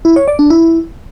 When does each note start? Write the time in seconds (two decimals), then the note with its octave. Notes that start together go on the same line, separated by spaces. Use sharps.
0.05 E4
0.16 C#5
0.28 D5
0.39 D4
0.50 E4